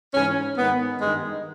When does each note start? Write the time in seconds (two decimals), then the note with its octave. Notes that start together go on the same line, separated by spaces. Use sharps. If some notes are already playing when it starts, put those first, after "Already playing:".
0.14 G#2 E3 C#4
0.57 G#2 D#3 B3
1.00 G2 D#3 G#3